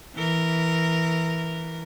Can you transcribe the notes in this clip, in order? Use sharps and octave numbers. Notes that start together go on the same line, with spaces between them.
E3 A#4